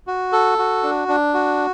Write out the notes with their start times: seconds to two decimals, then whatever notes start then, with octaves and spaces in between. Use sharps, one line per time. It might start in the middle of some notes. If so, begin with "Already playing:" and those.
0.07 F#4
0.32 A4
0.58 F#4
0.83 D4
1.08 D4
1.34 F#4